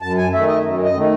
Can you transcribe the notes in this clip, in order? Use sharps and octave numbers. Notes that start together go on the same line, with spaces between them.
F#2 A5
G#5
D#3 A3 E5
D#5
F#2
D#5
D#3 A3